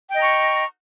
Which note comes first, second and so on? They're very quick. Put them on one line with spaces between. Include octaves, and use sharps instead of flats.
G5 D#5 A#5 C#6